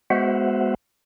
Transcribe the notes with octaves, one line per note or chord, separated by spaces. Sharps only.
G#3 B3 F#4 C5 E5 F#5